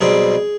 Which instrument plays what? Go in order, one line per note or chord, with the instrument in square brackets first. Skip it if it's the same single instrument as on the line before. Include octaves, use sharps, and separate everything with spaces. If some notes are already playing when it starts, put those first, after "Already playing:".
[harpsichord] B1 B2 G3 C4 G#4